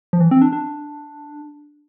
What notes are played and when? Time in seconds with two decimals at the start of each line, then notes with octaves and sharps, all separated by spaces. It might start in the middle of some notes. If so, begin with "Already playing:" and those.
0.13 F3
0.20 E3
0.31 C4
0.42 D4
0.53 D4